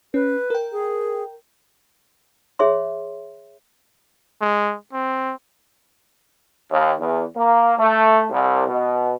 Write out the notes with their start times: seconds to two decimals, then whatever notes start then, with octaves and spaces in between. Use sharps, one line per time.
0.14 C#4 B4
0.50 A#4 G5
0.72 G#4
2.59 G#4 C#5 E5 C6
4.41 G#3
4.93 C4
6.70 D#2
7.00 E2
7.36 A#3
7.78 A3
8.31 C2
8.68 B2